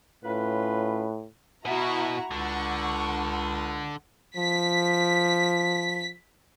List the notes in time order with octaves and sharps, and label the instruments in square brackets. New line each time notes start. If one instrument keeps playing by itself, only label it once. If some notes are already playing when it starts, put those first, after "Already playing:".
[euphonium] A2 [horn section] C#4 F4 B4
[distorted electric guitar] B2 [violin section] E4 F#4 A#5
[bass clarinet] C#2 [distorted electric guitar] D3 [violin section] F#5 C#6
[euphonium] F3 [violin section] B6